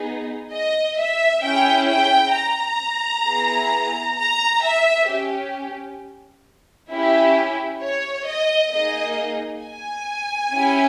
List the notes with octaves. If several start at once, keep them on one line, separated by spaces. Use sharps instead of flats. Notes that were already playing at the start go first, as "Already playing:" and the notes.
Already playing: B3 D#4 G#4
D#5
E5
C#4 E4 G#4 G5
G5
A#5
B3 E4 G#4
A#5
E5
C#4 G4
C#4 E4 G4
C#5
D#5
A#3 D#4 G#4 D#5
G#5
C#4 E4 G4